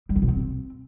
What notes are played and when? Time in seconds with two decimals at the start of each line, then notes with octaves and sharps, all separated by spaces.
0.09 G3
0.16 C4
0.22 B2
0.28 C4